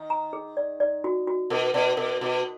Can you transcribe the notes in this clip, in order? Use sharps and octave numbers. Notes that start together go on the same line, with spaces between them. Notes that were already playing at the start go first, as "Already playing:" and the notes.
Already playing: D#3
A#5
G#4
D5
D5
F#4
F#4
B2 A#4
B2 D5
B2 A#4
B2 F#4